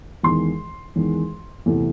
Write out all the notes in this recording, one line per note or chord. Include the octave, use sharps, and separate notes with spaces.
E2 D#3 G#3 C6
E2 D#3 G#3
E2 C3 E3 A3